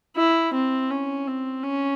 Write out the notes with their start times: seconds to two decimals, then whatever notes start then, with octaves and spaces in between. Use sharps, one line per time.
0.16 E4
0.54 C4
0.90 C#4
1.27 C4
1.63 C#4